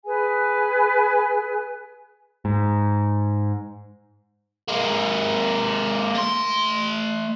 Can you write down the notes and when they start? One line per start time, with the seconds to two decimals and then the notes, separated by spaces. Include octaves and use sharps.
0.05 G#4 B4 G#5
2.45 G#2
4.68 G#3 A#3
6.15 A3 C6